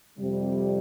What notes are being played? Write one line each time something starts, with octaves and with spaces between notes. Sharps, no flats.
F2 C3 G3